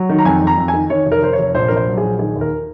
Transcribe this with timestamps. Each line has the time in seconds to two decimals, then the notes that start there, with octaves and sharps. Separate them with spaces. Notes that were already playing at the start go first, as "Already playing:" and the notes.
Already playing: F#3
0.09 D#3
0.18 A#5
0.25 F2 G#5
0.41 F2
0.47 A#5
0.57 F2
0.68 G#5
0.74 D#3
0.90 D#3 C#5
1.06 F1
1.11 A#4
1.22 F1 C5
1.33 C#5
1.39 F1
1.54 A#1 C5
1.68 A#1 A#4
1.76 C5
1.87 F#3
1.97 G#4
2.03 A#1
2.19 D#3 G#4
2.36 D#2
2.41 A#4